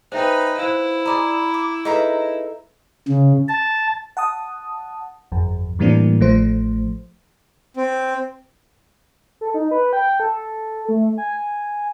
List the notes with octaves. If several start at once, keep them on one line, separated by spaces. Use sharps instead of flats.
D#4 G#4 B4 C5 E5 G5
E4 C5 F5
G#4 D5 A#5 B5 D#6
D6
D#4 G#4 A4 B4 E5 A#5
C#3
A5
F#5 A5 D#6
G1 F2
A2 E3 G3 A#3 C4 D4
A1 F3 A3 C5
C4
A4
D#4
B4
G5
A4
A3
G#5